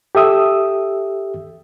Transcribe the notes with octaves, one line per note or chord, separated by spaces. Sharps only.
G4 A4 E5 D#6 E6